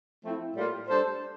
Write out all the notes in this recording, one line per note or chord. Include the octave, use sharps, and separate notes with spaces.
F3 A3 C4 E4
A2 G3 A#3 F4
G3 D4 A4 C5